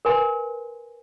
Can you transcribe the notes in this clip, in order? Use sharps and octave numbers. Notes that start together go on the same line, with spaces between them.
A#4 B4 G#5 C6